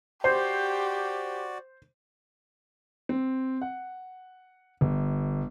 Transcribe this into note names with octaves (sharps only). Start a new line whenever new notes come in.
F#4 G4 C5 D5
C4
F#5
G1